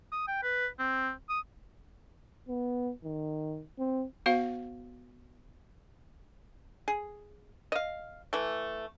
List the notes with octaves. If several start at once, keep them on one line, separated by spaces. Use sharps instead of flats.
D#6
G5
B4
C4
D#6
B3
D#3
C4
B3 F#4 C5 F5
G#4
D#5 F5
E3 A3